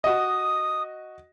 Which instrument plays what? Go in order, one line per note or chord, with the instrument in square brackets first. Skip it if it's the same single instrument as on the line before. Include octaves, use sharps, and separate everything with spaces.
[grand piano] F#4 D#5 [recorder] D#6